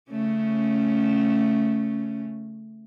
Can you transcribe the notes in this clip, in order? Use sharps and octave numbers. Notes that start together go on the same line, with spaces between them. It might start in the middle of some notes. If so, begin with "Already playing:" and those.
C#3 A3 C#4